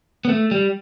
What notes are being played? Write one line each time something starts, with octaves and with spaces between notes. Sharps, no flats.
B3
A3
G3